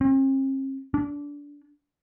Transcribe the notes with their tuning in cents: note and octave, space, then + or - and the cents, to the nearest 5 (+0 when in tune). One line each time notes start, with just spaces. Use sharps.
C4 +45
D4 -25